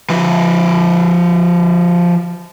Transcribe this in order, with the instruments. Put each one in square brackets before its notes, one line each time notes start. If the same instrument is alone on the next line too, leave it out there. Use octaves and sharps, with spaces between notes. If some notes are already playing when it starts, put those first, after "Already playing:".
[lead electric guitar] F3 B4